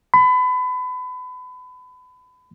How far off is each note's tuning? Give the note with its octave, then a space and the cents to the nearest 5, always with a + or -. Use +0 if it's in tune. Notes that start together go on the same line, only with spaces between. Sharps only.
B5 +30